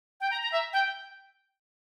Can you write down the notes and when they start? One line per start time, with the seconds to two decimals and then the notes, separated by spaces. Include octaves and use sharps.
0.21 G5
0.31 A#5
0.42 A#5
0.52 E5
0.73 G5